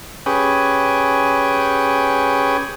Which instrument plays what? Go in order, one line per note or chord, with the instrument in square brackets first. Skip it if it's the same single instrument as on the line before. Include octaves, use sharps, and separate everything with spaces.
[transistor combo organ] C#4 G4 G#4 B4